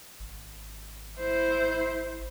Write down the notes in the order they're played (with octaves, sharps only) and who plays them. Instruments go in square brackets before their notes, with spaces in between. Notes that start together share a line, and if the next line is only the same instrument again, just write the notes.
[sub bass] G#1
[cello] E4 C5